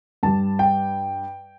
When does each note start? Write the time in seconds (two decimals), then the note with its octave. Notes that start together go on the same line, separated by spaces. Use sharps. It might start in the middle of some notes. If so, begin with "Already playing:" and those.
0.23 G2 G3 A5
0.59 G5